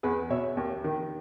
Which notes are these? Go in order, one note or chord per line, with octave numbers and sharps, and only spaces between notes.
E2 G#4 B4
B2 C#5 E5
D#2
D#3